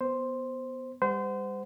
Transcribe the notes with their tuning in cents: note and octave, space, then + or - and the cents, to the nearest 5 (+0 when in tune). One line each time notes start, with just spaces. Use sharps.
B3 +0 C5 +0
G3 +35 C5 -30 F#5 +0